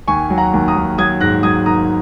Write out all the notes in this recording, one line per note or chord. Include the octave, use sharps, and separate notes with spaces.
D#2 G#5 C#6
F#3
F#5 A#5
D#2
A#5 D#6
D#2
F#3 D#6 G#6
G#2 F#6 A#6
F#3 D#6 G#6
D#3 A#5 D#6